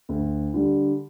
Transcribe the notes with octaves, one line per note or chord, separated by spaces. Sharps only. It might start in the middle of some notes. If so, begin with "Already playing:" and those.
D2
D3 G3